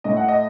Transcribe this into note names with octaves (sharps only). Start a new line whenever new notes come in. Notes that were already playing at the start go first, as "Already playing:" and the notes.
A2 A3 D#5
F#5
D#5